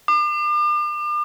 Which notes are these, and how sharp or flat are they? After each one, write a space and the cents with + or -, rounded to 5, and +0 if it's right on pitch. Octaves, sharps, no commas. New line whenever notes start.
D6 +40